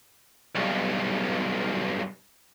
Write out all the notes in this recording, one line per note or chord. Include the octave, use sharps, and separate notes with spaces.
B1 G2